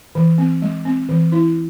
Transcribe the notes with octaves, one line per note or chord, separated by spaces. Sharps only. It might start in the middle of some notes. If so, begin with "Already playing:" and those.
E3
C4
G#3
C4
E3
E4